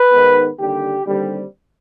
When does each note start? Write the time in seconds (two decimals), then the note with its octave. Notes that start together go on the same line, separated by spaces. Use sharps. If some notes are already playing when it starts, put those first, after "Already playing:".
Already playing: B4
0.10 G#2 D#3 B3
0.58 D#2 D3 G3 G4
1.05 D#2 D3 G3 C4